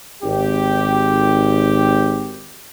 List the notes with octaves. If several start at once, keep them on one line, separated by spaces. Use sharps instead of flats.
G#1 G4